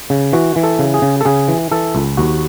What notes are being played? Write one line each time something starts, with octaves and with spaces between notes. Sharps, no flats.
C#3
E3 F#4
E3
A4
C#3
G#4
C#3
A4
C#3 G#4
E3
E3 A4
C#2
D#2 F#4